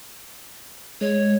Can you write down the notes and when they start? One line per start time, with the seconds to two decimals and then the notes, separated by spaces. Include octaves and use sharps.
1.01 G#3 C#5